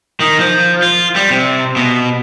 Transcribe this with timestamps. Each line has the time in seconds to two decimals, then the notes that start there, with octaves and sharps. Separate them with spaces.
0.20 D#3
0.40 F3
0.83 F4
1.16 G3
1.31 C3
1.76 B2